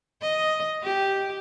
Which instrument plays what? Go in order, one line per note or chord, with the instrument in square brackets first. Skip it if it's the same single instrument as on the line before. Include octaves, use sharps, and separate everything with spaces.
[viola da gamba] D#5
G4